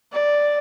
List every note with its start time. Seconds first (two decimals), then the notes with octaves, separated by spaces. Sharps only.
0.13 D5